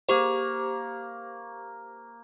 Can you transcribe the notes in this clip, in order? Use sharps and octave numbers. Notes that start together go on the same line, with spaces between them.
A#3 G4 C5 C#6